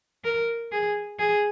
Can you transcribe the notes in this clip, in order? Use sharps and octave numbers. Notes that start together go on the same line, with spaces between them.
A#4
G#4
G#4